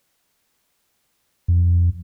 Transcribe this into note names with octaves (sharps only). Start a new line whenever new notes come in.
F2